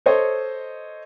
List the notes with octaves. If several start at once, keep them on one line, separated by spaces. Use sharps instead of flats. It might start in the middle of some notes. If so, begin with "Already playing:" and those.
A4 C5 C#5 D#5